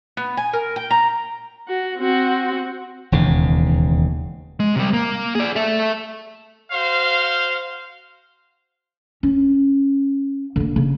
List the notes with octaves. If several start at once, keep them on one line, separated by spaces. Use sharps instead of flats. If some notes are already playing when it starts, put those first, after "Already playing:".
B3
G#5
A#4
G5
A#5
F#4
C4 F#4
E1 D#2 C#3
G#3
C3 G3
A#3
G#4 D5
A4 E5
F#4 C5 F5
C#4
D3 A#3
C#3